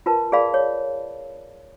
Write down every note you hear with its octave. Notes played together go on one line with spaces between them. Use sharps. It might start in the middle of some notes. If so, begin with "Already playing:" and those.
F4 A#4 B4 A5
G#4 A#4 D5 F5 B5
C#5